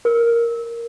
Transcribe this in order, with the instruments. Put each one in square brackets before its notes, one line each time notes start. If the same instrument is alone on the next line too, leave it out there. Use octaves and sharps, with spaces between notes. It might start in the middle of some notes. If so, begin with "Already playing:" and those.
[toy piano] A#4